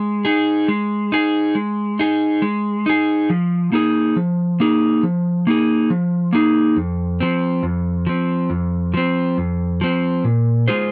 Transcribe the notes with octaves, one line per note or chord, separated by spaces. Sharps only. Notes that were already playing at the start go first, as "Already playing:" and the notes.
Already playing: G#3
D#4 G#4
G#3
D#4 G#4
G#3
D#4 G#4
G#3
D#4 G#4
F3
A#3 D#4 G#4
F3
A#3 D#4 G#4
F3
A#3 D#4 G#4
F3
A#3 D#4 G#4
F2
F3 C4
F2
F3 C4
F2
F3 C4
F2
F3 C4
A#2
G#3 F4 G#4 C5